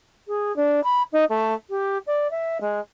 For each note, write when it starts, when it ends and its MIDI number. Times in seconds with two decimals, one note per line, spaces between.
0.28 0.55 68
0.56 0.80 62
0.84 1.02 83
1.12 1.25 63
1.29 1.54 57
1.70 1.98 67
2.06 2.27 74
2.31 2.58 76
2.61 2.80 56